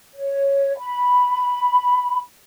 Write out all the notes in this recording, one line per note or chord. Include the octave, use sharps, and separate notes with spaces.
C#5
B5